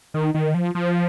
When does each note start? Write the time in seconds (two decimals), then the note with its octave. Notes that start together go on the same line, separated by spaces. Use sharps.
0.14 D#3
0.34 D#3
0.54 F3
0.75 F3